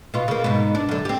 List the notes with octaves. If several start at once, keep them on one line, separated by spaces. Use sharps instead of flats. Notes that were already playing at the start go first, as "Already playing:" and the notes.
B2 F4
C#3 A#3
G#2 B2
D4
F#2 D3
C4 G4